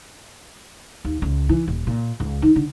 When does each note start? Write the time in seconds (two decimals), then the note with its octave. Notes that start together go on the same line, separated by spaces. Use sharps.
1.05 D#2
1.22 C#2
1.49 E3
1.68 D#1
1.87 A#2
2.20 C#2
2.42 D#3
2.56 D3